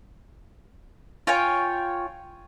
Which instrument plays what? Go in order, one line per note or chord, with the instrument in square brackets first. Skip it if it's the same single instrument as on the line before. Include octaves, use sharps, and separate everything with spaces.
[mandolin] F4 C#5 G5 G#5